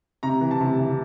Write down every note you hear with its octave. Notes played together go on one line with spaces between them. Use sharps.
C3 A#5
E3
A5
C3
E3